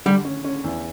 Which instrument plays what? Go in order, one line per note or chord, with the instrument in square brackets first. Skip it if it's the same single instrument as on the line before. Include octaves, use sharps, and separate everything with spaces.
[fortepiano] D3 [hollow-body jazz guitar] G3
[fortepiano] C#4
C#4
E2